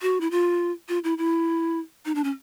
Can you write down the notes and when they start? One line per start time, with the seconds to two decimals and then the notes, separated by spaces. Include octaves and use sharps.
0.02 F#4
0.21 E4
0.31 F4
0.89 F4
1.04 E4
1.18 E4
2.05 D#4
2.15 D4
2.24 C#4